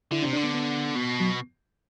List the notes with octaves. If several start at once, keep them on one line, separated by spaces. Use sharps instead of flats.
D3 E4
C3 D4
D3 D4
B3
B3
B2
F#3